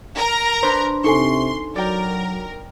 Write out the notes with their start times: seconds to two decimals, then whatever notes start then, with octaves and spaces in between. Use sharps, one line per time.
0.16 A#4 A#5
0.63 D4 B4 C5
1.04 C3 D#4 A4 G#5 C6 C#6
1.76 F#3 A#4 D5 G5